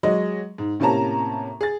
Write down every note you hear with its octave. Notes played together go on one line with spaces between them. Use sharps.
F#3 G#3 D#5
G#2
A2 C3 A#3 C#4 A5 A#5
G#4 A6